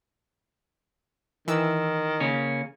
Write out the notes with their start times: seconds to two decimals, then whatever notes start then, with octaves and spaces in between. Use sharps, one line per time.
1.48 D#3 E3 E6
2.20 C#3 A#3 C#4